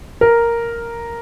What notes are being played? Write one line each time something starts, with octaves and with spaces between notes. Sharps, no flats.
A#4